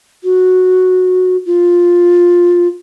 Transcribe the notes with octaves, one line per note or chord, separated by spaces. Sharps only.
F#4
F4